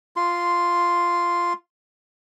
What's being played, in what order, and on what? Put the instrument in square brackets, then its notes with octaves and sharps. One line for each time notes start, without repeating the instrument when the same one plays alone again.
[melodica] F4 C6